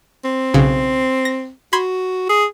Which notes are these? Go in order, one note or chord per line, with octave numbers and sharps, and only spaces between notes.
C4
B1 C#3
A#6
F#4 B5 C6 G#6
G#4